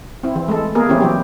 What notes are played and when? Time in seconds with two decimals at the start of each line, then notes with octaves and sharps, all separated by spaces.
0.23 C4 E4
0.35 E3
0.48 G#3 A3 A4
0.75 A#3 B3 G#4 A#4
0.89 E3 C4 C#4 E4 G4
1.01 E3 F#3 G4